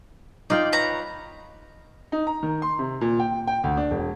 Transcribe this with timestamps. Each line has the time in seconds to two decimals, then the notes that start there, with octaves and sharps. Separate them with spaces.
0.50 D#4 F4 D5 G5
0.72 B4 C#5 A#5
2.12 D#4
2.27 A#5
2.43 D#3
2.62 C6
2.79 C3
3.01 A#2
3.19 G5
3.47 G5
3.64 D2
3.77 D4
3.91 E1